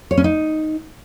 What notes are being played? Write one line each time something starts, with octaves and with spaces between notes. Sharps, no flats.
C#5
C#4
D#4